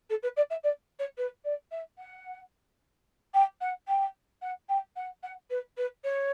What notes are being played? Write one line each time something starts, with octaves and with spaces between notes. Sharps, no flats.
A4
B4
D5
E5
D5
C#5
B4
D5
E5
F#5
G5
F#5
G5
F#5
G5
F#5
F#5
B4
B4
C#5